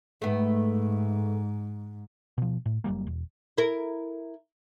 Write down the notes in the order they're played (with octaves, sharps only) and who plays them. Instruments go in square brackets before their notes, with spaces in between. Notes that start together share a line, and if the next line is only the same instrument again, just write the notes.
[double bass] G#2 [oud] A3 B3
[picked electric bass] B2 F3
A2
F#1 F#3 G3 A#3
E1
[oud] E4 A#4